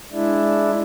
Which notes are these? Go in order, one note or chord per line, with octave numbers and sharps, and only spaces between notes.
G#3 D4 E4